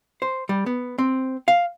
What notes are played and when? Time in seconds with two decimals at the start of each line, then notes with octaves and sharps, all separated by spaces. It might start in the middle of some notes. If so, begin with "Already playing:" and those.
0.22 C5
0.49 G3
0.66 B3
0.98 C4
1.48 F5